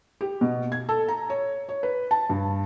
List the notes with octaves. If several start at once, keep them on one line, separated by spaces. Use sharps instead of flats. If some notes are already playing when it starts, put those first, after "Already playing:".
G4
B2
G#6
A4
A#5
C#5
C#5
B4
A5
G2